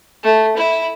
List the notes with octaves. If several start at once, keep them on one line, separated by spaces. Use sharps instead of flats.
A3
E4